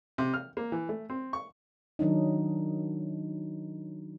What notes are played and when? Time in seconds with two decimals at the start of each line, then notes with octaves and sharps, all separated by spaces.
0.18 C3
0.34 F6
0.57 A#3
0.72 E3
0.89 A3
1.10 C4
1.33 C#6
1.99 D#3 F#3 D4 D#4